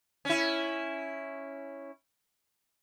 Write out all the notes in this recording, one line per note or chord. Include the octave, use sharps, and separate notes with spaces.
C#4 E4